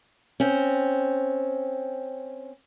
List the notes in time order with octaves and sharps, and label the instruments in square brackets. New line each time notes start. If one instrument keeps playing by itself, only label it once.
[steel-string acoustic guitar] C4 C#4